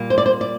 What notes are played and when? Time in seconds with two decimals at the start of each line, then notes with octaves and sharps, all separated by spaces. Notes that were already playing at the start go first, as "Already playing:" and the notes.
Already playing: A#2 G3 A#3
0.10 C5
0.18 D5
0.26 C5
0.41 D5